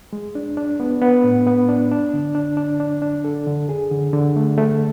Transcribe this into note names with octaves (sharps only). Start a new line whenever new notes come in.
G#3
D4
D4
B3
B3
A2
B3
D4
D4
D3
D4
D4
D4
D4
A4
D3
G#4
D3
D3
A3
A3